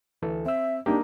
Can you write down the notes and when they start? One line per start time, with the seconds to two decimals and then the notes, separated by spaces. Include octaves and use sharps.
0.22 D2 E3 A4
0.46 C4 E5 E6
0.86 A#3 D4 D#4 G4